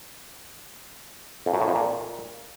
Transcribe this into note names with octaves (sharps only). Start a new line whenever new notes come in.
F2
F#2
A2
F2
A#2